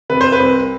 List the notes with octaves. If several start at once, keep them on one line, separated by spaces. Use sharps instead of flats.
C3 B4
C5
B4
C2